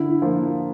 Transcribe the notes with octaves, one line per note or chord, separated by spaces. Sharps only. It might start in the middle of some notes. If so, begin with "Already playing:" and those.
Already playing: D3 E4
E4
F3 A#3 F4